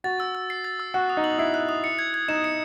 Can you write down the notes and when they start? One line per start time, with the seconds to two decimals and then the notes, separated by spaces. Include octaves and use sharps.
0.04 F#4 A6
0.20 E6
0.35 E6
0.50 C7
0.64 A6
0.80 E6
0.94 F#4 F#6
1.10 D#6
1.17 D#4
1.24 F#7
1.39 E4 C7
1.54 F#6
1.69 D#6
1.84 C#7
1.99 G#6
2.14 G#6
2.28 D#4 E7
2.44 C#7